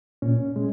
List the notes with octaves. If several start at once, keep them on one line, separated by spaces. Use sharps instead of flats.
A#2 C#4
G#3